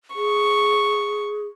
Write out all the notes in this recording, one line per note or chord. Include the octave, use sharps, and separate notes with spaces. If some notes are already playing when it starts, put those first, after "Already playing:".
G#4 C#6